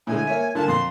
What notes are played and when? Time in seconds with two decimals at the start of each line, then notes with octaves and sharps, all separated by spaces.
0.07 A2 D3 G#3 G#5
0.27 A#3 C#5 E5
0.55 A#2 D3 A#3 A5
0.68 F2 C6